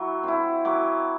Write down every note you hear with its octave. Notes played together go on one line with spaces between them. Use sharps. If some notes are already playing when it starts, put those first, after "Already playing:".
Already playing: F#3 E4
C4 E4
F#3 D6